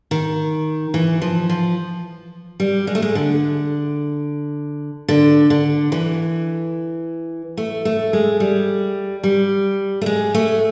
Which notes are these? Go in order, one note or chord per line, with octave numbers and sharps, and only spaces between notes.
D#3
E3
F3
F3
G3
G#3
A3
G#3
D3
D3
D3
E3
A3
A3
G#3
G3
G3
A3
G#3
A3